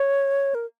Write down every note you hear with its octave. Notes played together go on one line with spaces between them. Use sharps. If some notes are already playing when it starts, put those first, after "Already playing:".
Already playing: C#5
A#4